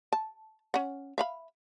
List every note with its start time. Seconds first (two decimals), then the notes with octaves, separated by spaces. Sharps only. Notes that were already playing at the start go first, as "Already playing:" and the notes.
0.13 A5
0.74 C#4 F#5
1.18 E5 F5 B5